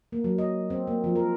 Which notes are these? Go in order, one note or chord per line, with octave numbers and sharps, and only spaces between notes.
A#3
F#3
D#5
C4
A#3
F3
A#4